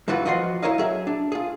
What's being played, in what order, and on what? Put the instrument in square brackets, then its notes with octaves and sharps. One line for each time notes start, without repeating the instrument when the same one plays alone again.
[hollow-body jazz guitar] G2 E3 F#3 F4 F#4 B4
F3 F4 F#4 D#5 F#5 C6
E4 A#4 C#5 D#5 F5
F#3 G#4 E5
D4
F4 G#4